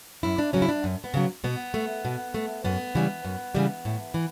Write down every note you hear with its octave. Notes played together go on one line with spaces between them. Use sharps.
F#2 E4
D4
C#3 F#3 C#4
E4
D4
F#2
B3
C#3 F#3
B2 B3
A3
B2
A3
F#2 B3
C#3 E3 G3
F#2
C#3 E3 G3
A2
E3